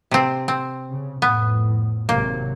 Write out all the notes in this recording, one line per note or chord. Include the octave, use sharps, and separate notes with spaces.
C3 C4
C4
C#3
F2 A2 B3
G#1 C3 F#3 A#3